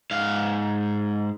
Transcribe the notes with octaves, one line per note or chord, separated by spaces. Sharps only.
G#2 F5